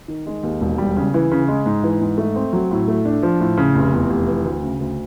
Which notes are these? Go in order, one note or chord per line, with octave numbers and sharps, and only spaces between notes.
D#3
G#3
D#2
E1
G3
C#3
E3
C#3
G#3
G#2
E3
G#2
A3
C4
F#3
A2
A3
D4
F3
A2
C#3
F1
E2
F1
E3
D2
C#3
D2